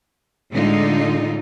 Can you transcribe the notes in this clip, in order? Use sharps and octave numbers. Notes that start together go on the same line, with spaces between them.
A2 D3 G#3 D#4 F4